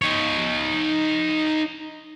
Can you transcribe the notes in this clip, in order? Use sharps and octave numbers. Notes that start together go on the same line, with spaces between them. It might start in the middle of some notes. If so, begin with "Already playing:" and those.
D#4 C#5